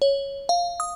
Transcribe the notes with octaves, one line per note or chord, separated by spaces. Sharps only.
C#5
F5
D#6